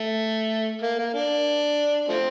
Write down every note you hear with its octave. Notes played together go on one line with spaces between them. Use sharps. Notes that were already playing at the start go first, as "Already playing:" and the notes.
Already playing: A3
A#3
A#3
D4
F3 A3 C4